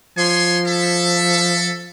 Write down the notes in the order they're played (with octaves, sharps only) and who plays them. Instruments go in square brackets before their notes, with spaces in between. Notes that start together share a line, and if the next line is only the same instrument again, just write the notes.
[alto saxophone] F3 [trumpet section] C#5 G#5 C6
[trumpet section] A4 E5